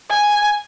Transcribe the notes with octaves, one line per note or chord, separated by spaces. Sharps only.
G#5